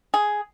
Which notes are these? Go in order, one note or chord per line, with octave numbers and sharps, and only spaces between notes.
G#4